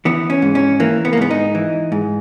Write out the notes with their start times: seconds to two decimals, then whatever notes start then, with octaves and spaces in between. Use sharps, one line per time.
0.05 E3 B3
0.30 C#4
0.42 G#2
0.55 C#4
0.80 E3 A#3
1.05 B3
1.13 A#3
1.17 G#2 B3
1.31 D#4
1.55 E3
1.92 G#2